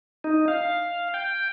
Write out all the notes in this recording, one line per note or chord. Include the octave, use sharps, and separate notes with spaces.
D#4
F5
G5